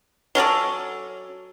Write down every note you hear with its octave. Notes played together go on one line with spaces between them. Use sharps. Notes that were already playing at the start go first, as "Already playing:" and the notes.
F#3 C#4 A4 D5